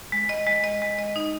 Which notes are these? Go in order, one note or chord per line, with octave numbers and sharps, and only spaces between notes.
G#3
D#5
G#3
D#5
G#3
D#5
D#4